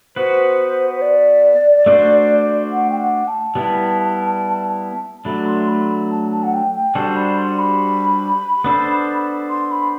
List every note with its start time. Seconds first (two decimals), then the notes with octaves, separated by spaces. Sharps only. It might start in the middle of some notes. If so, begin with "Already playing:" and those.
0.16 B3 F#4 B4 C5
0.95 C5
1.02 D5
1.86 A3 D4 F#4 C5
2.71 F#5
2.90 G5
3.00 F#5
3.27 A5
3.55 G3 B3 E4
5.25 F#3 A3 D4 B5
5.47 C6
5.68 B5
5.89 B5
6.11 A5
6.31 A5
6.44 F#5
6.53 G5
6.74 G5
6.95 G3 D4 F#4 A4 C5 A5
7.16 B5
7.38 C6
7.59 B5
8.64 B3 D4 A4 C5
9.50 C6
9.71 B5